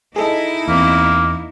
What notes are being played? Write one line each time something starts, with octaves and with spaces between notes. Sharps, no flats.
D#4 E4 G#4 A4 D#5
E2 A#3 C4